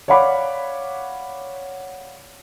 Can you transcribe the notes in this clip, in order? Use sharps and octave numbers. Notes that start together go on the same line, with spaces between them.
C#5 D5 F5 F#5 B5 D6